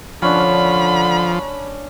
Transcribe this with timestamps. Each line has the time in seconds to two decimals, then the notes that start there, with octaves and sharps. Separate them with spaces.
0.22 D3 F3 C#4 D4 B5